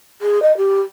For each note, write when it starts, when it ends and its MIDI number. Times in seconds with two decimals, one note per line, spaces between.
0.22 0.42 68
0.42 0.55 75
0.57 0.81 67